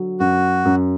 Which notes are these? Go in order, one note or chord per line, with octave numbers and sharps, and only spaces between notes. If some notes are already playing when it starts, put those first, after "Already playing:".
Already playing: D3 F#3
F#2 F#4
F#2